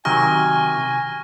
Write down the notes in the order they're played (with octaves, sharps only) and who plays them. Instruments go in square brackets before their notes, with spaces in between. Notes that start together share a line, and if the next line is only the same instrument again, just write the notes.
[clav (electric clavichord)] C3 D#3 F#3 [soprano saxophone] G#5 [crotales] C#6 F6 A#6